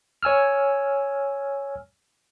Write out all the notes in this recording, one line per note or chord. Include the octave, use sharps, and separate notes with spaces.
C#5 G#5 E6 F6